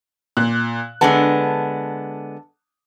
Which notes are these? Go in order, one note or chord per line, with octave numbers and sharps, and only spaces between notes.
A#2 F#6
D3 G#3 B3 A5